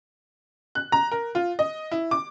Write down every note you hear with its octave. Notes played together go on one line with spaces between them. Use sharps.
F#6
A#5
A#4
F4
D#5
E4
D6